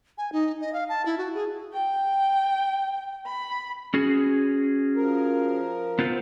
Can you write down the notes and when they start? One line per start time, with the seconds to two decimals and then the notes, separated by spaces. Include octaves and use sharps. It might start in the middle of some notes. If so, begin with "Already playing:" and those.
0.18 G#5
0.32 D#4
0.61 D#5
0.73 F5
0.89 A5
1.06 E4
1.18 F#4
1.35 G#4
1.71 G5
3.26 B5
3.94 C#4 F#4 G#4
4.96 F3 A#4
5.99 B3 C4 F4